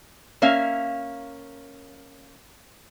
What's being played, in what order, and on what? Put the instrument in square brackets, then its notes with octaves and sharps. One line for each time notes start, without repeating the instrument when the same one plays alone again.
[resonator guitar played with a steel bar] A#3 C#4 E5 F5